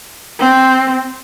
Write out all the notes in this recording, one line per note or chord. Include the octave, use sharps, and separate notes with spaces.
C4